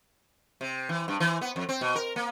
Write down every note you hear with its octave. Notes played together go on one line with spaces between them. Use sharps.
C3
E3
G2
E3
B3
F2
C4
B2
A#4
A#3